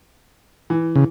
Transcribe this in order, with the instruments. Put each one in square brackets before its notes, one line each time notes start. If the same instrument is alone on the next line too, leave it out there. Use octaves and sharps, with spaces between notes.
[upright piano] E3
[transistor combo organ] C#3